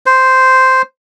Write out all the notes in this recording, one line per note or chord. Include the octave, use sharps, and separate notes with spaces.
C5